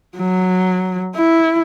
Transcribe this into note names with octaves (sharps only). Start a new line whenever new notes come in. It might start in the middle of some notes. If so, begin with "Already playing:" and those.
F#3
E4